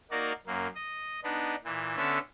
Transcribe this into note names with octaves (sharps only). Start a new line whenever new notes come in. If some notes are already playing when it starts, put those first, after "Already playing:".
A#3 D#4 F#4 A#4 D5
F#2 A#3
D#5
B3 D4 D#4
A#2 E3
D3 B3 C#4 A4 E5